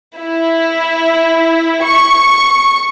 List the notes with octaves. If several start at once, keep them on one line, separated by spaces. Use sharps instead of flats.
E4
C#6